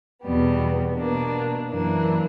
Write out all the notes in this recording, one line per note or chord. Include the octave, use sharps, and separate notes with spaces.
E2 B2 G3 B3
B2 A#3 D4
F#2 E3 A#3 D4